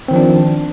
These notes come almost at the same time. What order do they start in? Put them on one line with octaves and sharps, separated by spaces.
C4 D#3 F3 D4